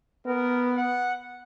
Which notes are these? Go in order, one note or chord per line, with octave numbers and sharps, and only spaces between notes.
B3 A#4
F#5